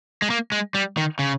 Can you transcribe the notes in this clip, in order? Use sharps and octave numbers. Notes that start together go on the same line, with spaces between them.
G#3
A#3
G#3
G3
D#3
C#3